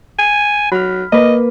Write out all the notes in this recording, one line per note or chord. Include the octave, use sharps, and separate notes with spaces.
G#5
F#3 B5 F6
A#3 B4 D#5